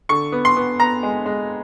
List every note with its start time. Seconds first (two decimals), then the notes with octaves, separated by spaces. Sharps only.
0.09 D3 C#6
0.32 B3
0.45 C6
0.56 B3
0.80 B3 A#5
1.03 G#3
1.26 G#3